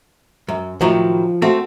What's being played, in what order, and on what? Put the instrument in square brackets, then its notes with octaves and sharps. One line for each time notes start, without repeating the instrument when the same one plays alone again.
[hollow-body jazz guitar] F#2
[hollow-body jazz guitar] A2 D#3 F#3 [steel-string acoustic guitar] F3
[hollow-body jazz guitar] A3 C4 F#4